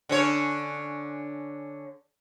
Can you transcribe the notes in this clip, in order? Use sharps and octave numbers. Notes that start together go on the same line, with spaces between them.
D3 C#4 C#5